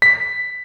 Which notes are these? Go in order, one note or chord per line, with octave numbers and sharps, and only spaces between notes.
B6